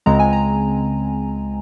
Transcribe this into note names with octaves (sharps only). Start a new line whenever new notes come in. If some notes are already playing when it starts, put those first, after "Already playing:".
C#2 C#3 G#3 C4 A#5
G#5
A#5